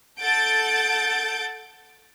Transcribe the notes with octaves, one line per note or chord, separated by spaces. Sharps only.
A4 F#5 G6 A6 D7